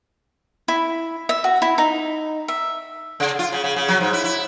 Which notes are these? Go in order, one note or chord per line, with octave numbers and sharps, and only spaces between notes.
E4
E5
F#4
E4
D#4
E5
C#3
F4
C#3
C#3
C#3
F#3
G#2
E4
E4